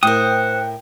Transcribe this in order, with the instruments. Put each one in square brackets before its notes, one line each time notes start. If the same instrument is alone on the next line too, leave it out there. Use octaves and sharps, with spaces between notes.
[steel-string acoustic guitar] A2 A#4 [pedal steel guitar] C5 D#6 [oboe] F#5 [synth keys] G5